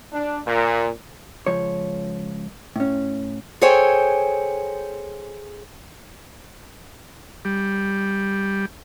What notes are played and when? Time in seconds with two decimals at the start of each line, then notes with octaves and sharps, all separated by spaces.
0.12 D4
0.46 A#2
1.47 C#2 F3 C#5
2.76 A2 C#4
3.61 G#4 A4 C5 C#5 G5 G#5
7.45 G3